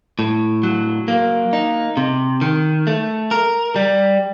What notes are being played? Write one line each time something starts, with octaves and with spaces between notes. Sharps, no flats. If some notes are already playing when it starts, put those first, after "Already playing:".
A2
F#3
A#3
D#4
C3
D#3
A3
A#4
G3